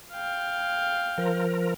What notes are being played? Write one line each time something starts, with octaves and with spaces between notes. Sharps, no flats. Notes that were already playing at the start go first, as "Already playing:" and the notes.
F5 G5
F3 A#4